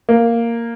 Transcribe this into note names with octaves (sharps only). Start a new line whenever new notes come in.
A#3